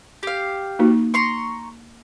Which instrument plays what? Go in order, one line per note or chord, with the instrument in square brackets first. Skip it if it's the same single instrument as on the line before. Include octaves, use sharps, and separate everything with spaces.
[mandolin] G4 F5
[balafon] A#3 D#4 F#4
[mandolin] A#5 C6 C#6